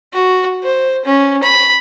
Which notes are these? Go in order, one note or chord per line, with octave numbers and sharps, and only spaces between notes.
F#4
C5
C#4
B5